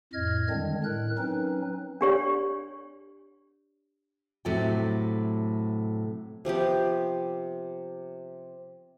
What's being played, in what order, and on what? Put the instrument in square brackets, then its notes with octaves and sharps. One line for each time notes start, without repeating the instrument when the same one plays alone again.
[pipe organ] F2 A2 D#5 F6 G#6
D3 D#3 G3 G#3 C4 D4
A2 A#4 F#6
F#3 C4 C#4 D#4 B4
[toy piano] D4 G4 C#5 D5
[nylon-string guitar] A2 C3 F#3 A4 G5
[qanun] C3 F3 B3 G4